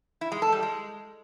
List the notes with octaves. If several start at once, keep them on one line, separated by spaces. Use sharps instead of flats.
E4
G#3
A4
G3
G#3